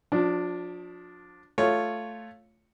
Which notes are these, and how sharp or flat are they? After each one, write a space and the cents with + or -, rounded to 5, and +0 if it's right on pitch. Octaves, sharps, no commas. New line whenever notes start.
F3 +35 D4 +0
A3 +0 F4 +0 C#5 +0